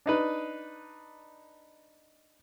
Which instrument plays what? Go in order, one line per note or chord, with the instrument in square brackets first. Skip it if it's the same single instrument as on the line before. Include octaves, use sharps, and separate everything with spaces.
[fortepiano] D4 D#4 B4